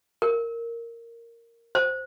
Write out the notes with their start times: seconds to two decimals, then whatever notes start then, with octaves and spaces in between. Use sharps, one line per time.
0.22 A#4
1.75 C5